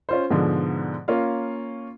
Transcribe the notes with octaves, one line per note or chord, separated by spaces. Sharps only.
C#4 F4 C5
G#2 B2 D3 F3 G#3
A#3 C#4 F4 F5